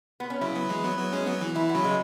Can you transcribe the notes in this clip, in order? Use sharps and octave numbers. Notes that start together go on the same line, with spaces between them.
B3
C#4
C#3 F#3 E4
F#3 B3
E3 G#3
F#3 B3
F#3 B3
G#3 C#4
F#3 B3
E3
E3 E4
B3
C#3 F#3
G#3